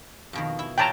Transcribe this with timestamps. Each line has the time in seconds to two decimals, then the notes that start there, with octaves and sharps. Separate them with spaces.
0.33 F2 B2 D#3
0.59 E4
0.78 A#2 G4 C#5 G5 A5 A#5